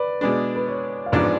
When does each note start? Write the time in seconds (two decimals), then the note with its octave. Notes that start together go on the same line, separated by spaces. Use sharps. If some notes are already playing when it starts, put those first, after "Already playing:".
Already playing: B4 D5
0.21 B2 G#3 D4 B4
0.56 B4
0.67 C#5
1.06 F5
1.12 A1 G#2 F3 B3 D4 D5